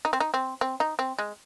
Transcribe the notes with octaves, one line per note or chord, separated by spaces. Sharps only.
D#4
C4
D#4
C4
C4
D#4
C4
G#3